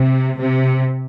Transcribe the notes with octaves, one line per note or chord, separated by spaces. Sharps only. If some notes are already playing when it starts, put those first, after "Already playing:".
Already playing: C3
C3